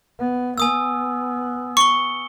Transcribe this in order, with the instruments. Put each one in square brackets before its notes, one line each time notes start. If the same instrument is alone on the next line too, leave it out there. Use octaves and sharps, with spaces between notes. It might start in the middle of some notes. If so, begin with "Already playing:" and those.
[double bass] B3
[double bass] B3 [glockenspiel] G#5 D#6 E6
[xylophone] C#6 [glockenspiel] C#7 G7